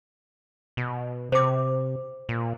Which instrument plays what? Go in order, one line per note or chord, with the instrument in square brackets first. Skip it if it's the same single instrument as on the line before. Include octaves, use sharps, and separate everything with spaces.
[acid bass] B2
[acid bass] C3 [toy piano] C5 D6
[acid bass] A#2